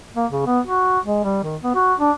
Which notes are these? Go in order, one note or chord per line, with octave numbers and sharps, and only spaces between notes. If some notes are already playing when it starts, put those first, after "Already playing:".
A#3
C#3
B3
F#4
G#3
G3
D#3
B3
F#4
D4